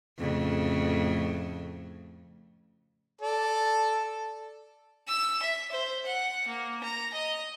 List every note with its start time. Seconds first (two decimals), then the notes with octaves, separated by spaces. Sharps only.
0.18 F2 A2 C#3
3.21 A4 D5
5.08 E6
5.42 E5
5.71 C5
6.06 F#5
6.47 A#3
6.83 A#5
7.13 D#5